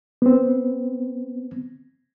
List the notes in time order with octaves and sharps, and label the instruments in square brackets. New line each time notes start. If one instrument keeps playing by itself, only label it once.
[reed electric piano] B3 C4